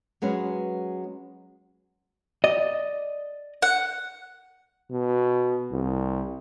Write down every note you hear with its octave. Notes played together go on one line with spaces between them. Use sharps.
F#3 G#3 B3 C#4
D5 D#5
F#5
B2
C2